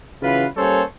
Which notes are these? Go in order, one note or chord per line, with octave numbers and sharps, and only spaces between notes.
C#3 E3 F#3 F4 B4
G3 A#3 C#4 A4 C5 C#5